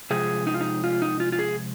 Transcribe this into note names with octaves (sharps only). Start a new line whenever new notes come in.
C3 F3 G#3 G#4
D#4
F4
D#4
F4
D#4
F4
F4
G#4